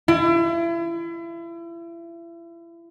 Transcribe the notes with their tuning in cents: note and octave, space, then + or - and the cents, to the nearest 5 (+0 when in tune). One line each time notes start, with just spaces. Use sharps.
E4 +35